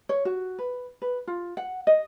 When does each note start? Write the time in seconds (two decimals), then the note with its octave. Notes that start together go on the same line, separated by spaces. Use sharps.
0.09 C#5
0.25 F#4
0.59 B4
1.02 B4
1.27 F4
1.57 F#5
1.87 D#5